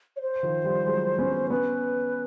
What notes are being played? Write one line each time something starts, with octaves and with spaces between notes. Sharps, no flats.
C#5
C5
D#3 F3
F3 G3
F#3 G#3
B3 C#4
B3 C#4 B4